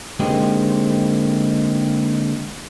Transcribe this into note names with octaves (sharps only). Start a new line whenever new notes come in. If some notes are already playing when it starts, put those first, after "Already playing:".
D3 G#3 A#3 C4 D#4 G4